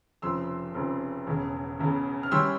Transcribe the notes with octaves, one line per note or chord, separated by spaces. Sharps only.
F1 F2 C#3 F3 C6 E6
F1 F2 C#3 F3
E1 E2 C#3
E1 E2 C#3
F6
E3 G3 C#4 C6 E6